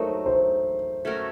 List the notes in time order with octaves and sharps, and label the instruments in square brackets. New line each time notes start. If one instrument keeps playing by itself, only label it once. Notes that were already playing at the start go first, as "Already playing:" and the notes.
Already playing: [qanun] F#3 A3 D#4 [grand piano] A#4 C5 C#5
[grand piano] C5
[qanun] A3 C#4 F#4 A#4